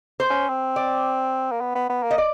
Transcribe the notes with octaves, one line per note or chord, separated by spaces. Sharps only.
C5
C#4
C4
D5
A#3
B3
B3
B3
A#3
D#5
D5